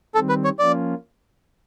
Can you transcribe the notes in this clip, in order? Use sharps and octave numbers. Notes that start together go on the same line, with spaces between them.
D#3 G3 C4 A4
B4
C#5
F3 A#3 C#4 F4 D5